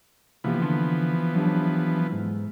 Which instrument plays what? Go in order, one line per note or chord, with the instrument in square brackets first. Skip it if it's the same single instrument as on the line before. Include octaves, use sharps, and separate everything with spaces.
[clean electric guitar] C3 A#3 G4 [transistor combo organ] E3 F3 B3
[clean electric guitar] D3 C6
F#3 D4 G4
G#2